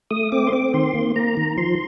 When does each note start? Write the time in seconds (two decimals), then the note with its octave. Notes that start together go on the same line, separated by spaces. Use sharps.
0.11 A3 D#6
0.32 C4 D6
0.47 C6
0.52 C4 D6
0.74 D#3 C6
0.95 A#3
1.16 A#3 A#5
1.37 D#3
1.58 F3 C6